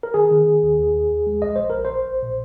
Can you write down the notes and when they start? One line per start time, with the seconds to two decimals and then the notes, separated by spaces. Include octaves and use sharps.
0.03 A#4
0.14 D#3 G#4
0.31 D#3
0.47 D#3
0.63 D#2
0.78 D#2
0.94 D#2
1.10 D#2
1.27 G#3
1.42 A#1 D#5
1.56 A#1 C5
1.70 A#1 A#4
1.85 C5
1.90 A#1
2.06 A#1
2.23 A#2